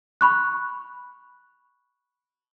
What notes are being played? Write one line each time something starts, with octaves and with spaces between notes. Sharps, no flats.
B5 C#6 F#6